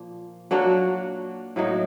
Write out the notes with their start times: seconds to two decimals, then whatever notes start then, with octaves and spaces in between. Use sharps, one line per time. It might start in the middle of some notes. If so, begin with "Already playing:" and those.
Already playing: A#2 F3 A#3
0.51 F#3 A#3 D4 F#4
1.56 A2 F#3 A#3 D#4